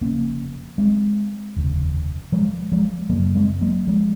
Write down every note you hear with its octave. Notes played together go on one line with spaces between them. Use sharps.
F1 F2 C#3 A#3 C#4
G#3 C4
F1 D#2 C#3
F3 G#3
F3 G#3
F#1 F#2 C#3 F#3 A#3
G#3 C4
F#3 A#3
F3 G#3